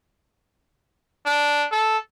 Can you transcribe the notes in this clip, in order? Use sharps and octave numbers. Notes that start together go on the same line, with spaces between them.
D4
A4